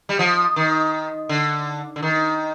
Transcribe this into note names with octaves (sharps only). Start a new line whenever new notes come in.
G3
F3
D#3
D3
D3
D#3